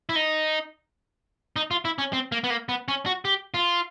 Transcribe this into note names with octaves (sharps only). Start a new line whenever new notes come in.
E4
D#4
D#4
F4
E4
C#4
C4
A#3
B3
A#3
B3
C#4
F#4
G4
F4